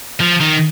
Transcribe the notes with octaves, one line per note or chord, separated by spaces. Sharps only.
F3
D#3